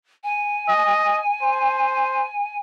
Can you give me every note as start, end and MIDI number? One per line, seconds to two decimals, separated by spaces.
0.24 2.57 80
0.68 1.19 75
1.43 2.26 72